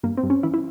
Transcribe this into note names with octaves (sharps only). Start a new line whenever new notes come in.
G2 A#3
C4
G2
C#4
E3 E4
E4